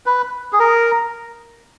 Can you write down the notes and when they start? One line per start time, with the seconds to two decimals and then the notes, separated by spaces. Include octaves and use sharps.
0.06 B4
0.53 G#4
0.59 A#4